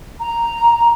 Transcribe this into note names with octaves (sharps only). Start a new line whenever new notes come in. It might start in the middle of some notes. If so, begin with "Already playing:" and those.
A#5